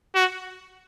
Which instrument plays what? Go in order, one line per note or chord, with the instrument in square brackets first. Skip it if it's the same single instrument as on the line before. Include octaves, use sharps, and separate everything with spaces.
[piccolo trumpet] F#4